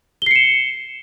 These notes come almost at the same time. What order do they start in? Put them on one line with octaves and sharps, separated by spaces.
G7 C7 C#7 E7